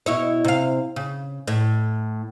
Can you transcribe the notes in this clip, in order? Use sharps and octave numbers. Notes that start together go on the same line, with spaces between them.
B2 E4 C#5
C3 F5
C#3
A2